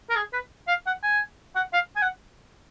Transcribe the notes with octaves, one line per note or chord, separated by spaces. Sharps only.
A#4
G#4
B4
F5
F#5
G#5
F#5
F5
G#5
F#5